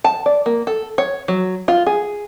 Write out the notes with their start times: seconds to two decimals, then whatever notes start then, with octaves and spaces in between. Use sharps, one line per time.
0.04 A5
0.26 D5
0.46 A#3
0.67 A4
0.98 C#5
1.28 F#3
1.68 F4
1.86 G#4